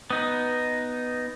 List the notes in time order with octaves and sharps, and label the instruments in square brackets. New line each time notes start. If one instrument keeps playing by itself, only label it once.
[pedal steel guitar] B3 D#4